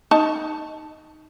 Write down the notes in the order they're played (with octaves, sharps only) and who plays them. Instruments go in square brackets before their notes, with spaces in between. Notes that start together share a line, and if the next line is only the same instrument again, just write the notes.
[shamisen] D#4 A5